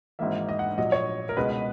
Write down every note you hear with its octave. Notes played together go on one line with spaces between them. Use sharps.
G#1 G#2 E3 A#3 E5
D#5
F#5
A#1 A#2 F#3 D#5
C#5
A#4
C#2 B2 G#3 B4